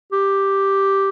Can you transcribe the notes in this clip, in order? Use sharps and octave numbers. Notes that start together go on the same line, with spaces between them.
G4